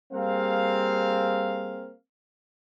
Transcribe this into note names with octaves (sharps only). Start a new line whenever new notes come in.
G3 A#3 C4 G#4 F5